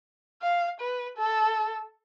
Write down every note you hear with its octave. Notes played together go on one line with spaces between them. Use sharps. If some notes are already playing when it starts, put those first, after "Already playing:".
F5
B4
A4